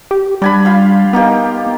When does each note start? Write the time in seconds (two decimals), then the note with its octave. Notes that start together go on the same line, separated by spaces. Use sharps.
0.11 G4
0.42 G3 D4 G#5 B5
0.65 F4 F5 G5
1.13 A#3 B3 D#4 G4